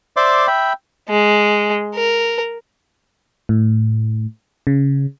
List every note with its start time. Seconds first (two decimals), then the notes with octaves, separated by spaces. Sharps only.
0.17 C5 D5 E5 C6 D6
0.47 E5 G5 B5
1.10 G#3
1.95 A#4
3.49 A2
4.67 C#3